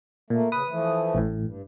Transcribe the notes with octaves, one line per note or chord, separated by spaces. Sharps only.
A#2 A3 A#3
C#3 B4 D#6
E3 F3 A3
A1 A2
G2